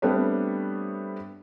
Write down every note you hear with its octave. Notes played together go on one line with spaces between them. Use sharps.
G3 A3 B3 C4 D4 C#5